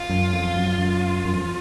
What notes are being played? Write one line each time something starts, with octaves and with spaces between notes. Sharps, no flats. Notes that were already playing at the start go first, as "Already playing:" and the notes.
Already playing: F4
F#2
F2
F#2
F#2
F#2
F2